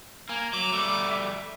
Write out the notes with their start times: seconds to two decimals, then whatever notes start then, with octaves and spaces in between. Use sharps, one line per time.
0.29 A#3 G#5
0.53 F#3 D6
0.72 G3 A3
1.11 E5